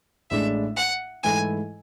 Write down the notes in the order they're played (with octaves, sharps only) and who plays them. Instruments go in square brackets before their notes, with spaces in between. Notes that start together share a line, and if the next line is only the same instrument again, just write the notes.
[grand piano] A1 A2 G#3 D4 [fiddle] E5
[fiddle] F#5
[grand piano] G#2 E3 A3 E4 A4 [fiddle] G#5